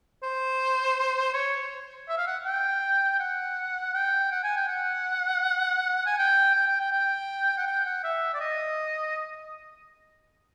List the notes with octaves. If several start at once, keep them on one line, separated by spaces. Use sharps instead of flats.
C5
C#5
E5
F5
F#5
G5
F#5
G5
F#5
G#5
G5
F#5
G#5
G5
G5
G5
G5
G5
F#5
G5
F#5
E5
D5
D#5